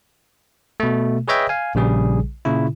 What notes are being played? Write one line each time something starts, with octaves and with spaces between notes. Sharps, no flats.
B2 A3
G#4 B4 C#5 D#5 E5 G5
F5 G#5
A#1 C#3 G3 G#4
A#2 C#3 E4